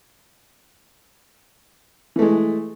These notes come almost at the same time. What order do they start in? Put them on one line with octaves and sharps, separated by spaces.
E3 A3 G#3